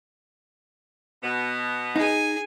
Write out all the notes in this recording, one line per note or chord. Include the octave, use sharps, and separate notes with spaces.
B2 B3
D#4 G#4 G#5